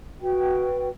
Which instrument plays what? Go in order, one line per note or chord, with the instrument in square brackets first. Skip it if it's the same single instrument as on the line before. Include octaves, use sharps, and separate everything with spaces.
[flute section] F#4 B4 G5